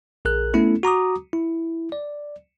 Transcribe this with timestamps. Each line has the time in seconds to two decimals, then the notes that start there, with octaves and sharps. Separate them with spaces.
0.25 A#1 G#4 A#4 F#6
0.54 A3 B3 C#4 E4 A4
0.83 F#4 A#5 D6 D#6
1.33 E4
1.92 D5